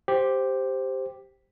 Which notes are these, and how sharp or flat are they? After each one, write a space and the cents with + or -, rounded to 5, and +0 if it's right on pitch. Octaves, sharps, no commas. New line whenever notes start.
G4 +0 C5 +0